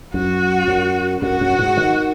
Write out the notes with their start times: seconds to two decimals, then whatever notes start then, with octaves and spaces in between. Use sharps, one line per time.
0.14 F#2 F#4
0.68 F#2
1.22 F#2 F#4
1.41 F#2
1.59 G#2
1.77 D#3